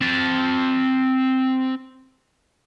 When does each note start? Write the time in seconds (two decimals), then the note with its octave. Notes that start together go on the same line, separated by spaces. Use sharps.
0.01 C4 A5